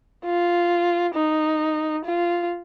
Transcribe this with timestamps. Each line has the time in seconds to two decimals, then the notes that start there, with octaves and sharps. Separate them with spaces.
0.25 F4
1.14 D#4
2.05 F4